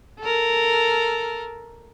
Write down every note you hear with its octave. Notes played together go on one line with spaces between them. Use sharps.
A4 A#4